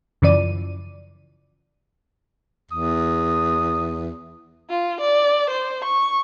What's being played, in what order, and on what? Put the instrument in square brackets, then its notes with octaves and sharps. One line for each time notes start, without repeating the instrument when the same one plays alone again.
[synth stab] F#2 C#3 E3 F3 D5 D#7
[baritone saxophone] E2 [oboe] D#6
[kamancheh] F4
D5
C5
C#6